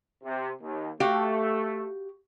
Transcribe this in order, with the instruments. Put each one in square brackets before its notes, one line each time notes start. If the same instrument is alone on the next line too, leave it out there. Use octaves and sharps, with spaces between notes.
[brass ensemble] C3
D#2
[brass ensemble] A3 [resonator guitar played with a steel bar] F#4 G4 F5